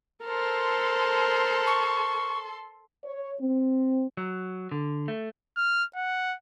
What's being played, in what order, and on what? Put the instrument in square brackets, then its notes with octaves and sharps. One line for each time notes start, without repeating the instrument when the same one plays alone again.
[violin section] A4 C6 [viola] A#4 C5
[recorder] C#6
[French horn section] C#5
C4
[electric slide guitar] F#3
D3
A3
[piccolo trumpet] F6
F#5